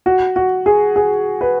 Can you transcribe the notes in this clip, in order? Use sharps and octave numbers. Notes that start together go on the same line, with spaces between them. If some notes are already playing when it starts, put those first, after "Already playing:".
F#4
F#4
G#4
G#4
B4